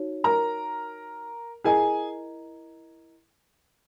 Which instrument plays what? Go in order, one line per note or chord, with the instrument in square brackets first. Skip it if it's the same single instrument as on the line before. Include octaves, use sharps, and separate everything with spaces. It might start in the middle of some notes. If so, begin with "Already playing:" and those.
Already playing: [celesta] D#4 F#4 C#5
[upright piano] A#4 A#5
[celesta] E4 A#4 D#5 A#5 [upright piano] G#4 G#5